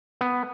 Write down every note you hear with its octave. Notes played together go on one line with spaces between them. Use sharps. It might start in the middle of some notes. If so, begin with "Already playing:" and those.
B3